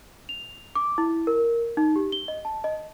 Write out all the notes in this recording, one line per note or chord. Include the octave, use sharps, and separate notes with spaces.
F7
D6
E4
A#4
D#4
G4
G7
D#5
A5
D#5